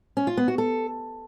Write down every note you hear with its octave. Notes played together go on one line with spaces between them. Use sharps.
C#4
F4
B3
F#4
A4